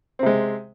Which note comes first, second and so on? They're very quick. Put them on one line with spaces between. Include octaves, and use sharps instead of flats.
C4 C3 G#3